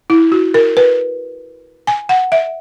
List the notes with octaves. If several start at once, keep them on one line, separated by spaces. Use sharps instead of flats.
E4
F#4
A#4
B4
G#5
F#5
E5